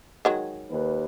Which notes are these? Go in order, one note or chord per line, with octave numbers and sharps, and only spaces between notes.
D#3 F#3 G#3
D#2 B4